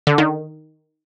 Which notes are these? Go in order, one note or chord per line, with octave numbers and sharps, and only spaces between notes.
D3
D#3